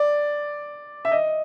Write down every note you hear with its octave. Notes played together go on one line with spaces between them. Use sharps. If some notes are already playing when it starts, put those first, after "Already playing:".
Already playing: D5
E5
D#5